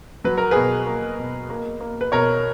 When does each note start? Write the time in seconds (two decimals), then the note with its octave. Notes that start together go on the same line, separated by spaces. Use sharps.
0.24 F#3 B4
0.38 A#4
0.51 B2 G#4 B4
0.87 A#3
1.19 B2
1.50 A#3
1.80 A#3
2.01 B4
2.12 B2 A#4 C#5